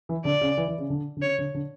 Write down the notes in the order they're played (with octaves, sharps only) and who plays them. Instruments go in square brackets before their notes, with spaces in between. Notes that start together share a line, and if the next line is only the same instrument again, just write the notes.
[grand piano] E3
[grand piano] D3 [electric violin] D5
[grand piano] C#3
E3
E3
C#3
D3
D3
[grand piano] C#3 [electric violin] C#5
[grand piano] D3
D3